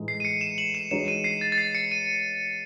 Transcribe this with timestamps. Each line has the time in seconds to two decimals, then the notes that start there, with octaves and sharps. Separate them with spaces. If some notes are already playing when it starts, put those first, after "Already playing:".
Already playing: A2 E3 G#3 D#4
0.08 C7
0.20 D#7
0.25 C#7
0.41 E7
0.58 F#7
0.75 E7
0.91 E3 G#3 D#4 F#4 C#5 E7
1.08 D#7
1.24 C7
1.41 A6
1.52 A6
1.58 C7
1.75 C#7
1.92 D#7